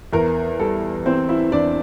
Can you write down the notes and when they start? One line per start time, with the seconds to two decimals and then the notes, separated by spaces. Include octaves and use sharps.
0.13 E2 A#4
0.59 G3 A4
1.05 E3 C4 C5
1.29 E4 E5
1.52 E2 D4 D5